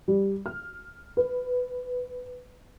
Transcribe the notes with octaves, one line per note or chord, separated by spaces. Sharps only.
G3
F6
B4